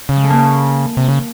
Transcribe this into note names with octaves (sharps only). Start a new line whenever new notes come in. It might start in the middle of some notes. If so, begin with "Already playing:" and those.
C#3
G#3
A3
A#3
C3
C#3